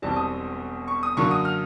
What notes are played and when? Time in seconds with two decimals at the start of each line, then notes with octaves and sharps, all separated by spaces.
0.02 E1 E2 B2 G3 C4 A5
0.16 D#6
0.88 C#6
1.03 D#6
1.17 F#2 D3 F#3 A#3 C#6
1.31 D#6
1.45 F6